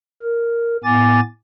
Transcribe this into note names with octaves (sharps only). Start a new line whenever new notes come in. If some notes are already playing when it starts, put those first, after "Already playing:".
A#4
A2 B3 G#5 D6 A6